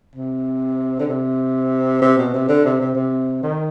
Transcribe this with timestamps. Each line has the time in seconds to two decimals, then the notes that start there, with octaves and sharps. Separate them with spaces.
0.16 C3
1.00 D3
1.08 C3
2.02 C3
2.18 B2
2.34 C3
2.48 D3
2.65 C3
2.81 C3
2.95 C3
3.43 D#3